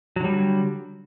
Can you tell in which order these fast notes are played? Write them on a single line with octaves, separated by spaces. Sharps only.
F#3 D3 G3